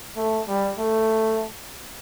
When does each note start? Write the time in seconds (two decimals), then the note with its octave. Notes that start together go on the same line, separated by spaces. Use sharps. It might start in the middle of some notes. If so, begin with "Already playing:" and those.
0.16 A3
0.48 G3
0.78 A3